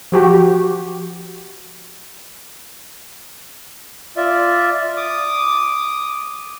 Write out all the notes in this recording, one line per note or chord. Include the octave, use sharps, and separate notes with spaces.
F3 F#4 G4
F4 D5 E5
D6 D#6